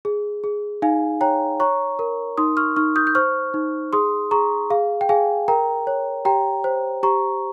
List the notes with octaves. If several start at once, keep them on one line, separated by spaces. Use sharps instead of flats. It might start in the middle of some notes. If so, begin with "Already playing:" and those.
G#4
G#4
D#4 F5 G#5
C#5 G5 A#5
C#5 A#5 C#6
A#4
D#4 C6 D#6
C#6 F6
D#4 C#6 F6
D#6 G6
G6
C5 C#6 F6
D#4
G#4 C6 D#6
G#4 A#5 C#6
G#4 F5
G5
G#4 F5 G#5
A#4 G5 A#5
C#5
G4 G5 A#5
C5
G4 A#5 C#6